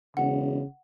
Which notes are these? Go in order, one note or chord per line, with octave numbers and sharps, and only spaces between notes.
E1 C#3 F#5